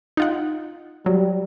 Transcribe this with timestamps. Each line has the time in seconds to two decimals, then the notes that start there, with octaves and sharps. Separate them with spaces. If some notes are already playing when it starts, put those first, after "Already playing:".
0.17 D#4 F4 F#5
1.06 F#3 G3